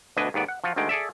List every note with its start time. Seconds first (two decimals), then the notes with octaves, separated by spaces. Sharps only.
0.17 D2 B2 D4 B4 D#5 G#5
0.34 D#2 G#2 B3 D5
0.48 F#5
0.64 F3 F4 F#4
0.76 D2 D3 D#3 G#3 G5
0.89 G#4 A4 D5 E5